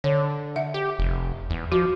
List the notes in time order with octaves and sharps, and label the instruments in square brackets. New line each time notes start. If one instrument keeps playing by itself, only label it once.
[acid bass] D3 [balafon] C#5
[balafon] E5 F#5
[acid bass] G4
F1
E2
[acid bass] F3 [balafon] F#4